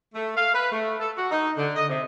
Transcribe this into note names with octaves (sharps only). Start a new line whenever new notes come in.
A3
F5
B4
A3
A4
F#4
D#4
D3
D#5
C3